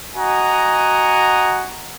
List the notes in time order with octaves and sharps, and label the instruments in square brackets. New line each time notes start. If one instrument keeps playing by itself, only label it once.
[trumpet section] F#4 D#5 F#5 G#5 A#5